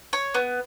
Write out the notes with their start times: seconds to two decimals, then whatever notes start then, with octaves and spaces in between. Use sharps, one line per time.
0.13 C#5
0.34 B3